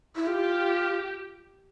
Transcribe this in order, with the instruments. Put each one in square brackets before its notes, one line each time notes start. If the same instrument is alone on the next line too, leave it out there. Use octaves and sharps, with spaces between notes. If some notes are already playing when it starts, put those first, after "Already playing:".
[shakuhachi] E4
[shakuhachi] F4 [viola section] G4